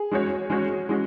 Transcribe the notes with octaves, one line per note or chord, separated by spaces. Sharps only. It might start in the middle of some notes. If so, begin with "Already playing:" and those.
Already playing: G#4
G#3 C#4 F#4 C#5
G#3 C#4 F#4 C#5
G#3 C#4 F#4